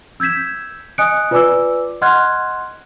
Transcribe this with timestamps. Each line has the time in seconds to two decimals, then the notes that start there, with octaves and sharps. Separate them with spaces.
0.20 E6 G6 G#6 B6 E7
0.98 D#5 G#5 D#6 F#6 C#7 D7
1.31 F4 B4 D5 G#5 D6 E6
2.01 D#5 F#5 C6 F6 F#6 G#6